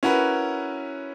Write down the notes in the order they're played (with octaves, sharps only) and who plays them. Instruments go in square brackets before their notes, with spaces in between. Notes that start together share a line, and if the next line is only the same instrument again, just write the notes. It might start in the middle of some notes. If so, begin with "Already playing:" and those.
[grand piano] C#4 E4 F#4 A#4 B4